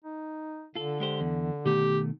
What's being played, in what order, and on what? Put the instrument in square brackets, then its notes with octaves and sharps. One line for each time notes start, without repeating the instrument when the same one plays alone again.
[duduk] D#4
[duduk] D3 [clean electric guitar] F4 A4
[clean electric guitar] G#3 G4 C5
E2
[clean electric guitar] B2 D#3 A3 [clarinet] G4